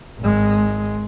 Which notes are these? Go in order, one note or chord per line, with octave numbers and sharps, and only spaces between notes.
G#1 G#3